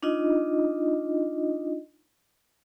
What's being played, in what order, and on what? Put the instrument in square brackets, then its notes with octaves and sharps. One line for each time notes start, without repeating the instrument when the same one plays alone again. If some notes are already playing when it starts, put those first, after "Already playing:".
[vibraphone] D4 D#4 F4 D#5